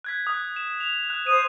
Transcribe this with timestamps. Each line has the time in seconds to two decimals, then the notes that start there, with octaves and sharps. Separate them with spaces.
0.04 F#6 G#6 B6
0.27 D#6 F#6
0.56 E7
0.80 F7
1.10 F#6
1.27 C5 D#6 D#7